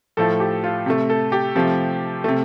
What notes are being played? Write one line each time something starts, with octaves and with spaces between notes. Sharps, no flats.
A2 F3 A3 A4
G4
F4
C3 A3
A4
G4
C3 F3 A3
C3 A3